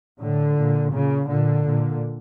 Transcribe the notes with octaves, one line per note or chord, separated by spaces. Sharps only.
A2 D3
A#2
A#2 C#3
A#2 D3
A#2